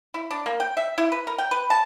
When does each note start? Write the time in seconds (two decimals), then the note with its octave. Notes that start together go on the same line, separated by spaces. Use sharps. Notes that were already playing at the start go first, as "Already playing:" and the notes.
0.14 E4
0.31 D4
0.46 A#3
0.60 G5
0.77 E5
0.98 E4
1.12 B4
1.27 A#4
1.38 G5
1.51 B4
1.70 A5